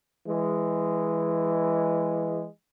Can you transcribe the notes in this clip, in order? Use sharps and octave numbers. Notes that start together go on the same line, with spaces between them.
E3 G#3